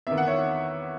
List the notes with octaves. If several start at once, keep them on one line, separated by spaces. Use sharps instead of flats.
E2 D#3 E5
F#5
C#5 E5